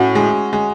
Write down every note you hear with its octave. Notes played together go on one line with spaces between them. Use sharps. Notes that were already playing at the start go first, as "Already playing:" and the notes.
Already playing: A2 C#4 F#4
G#3
G#3